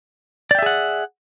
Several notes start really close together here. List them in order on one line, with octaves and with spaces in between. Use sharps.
D5 G5 E5 G#4 F#5